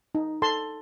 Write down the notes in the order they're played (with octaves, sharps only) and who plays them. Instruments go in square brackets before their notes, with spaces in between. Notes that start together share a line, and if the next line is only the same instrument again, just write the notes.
[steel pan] D#4
A4 A5 C6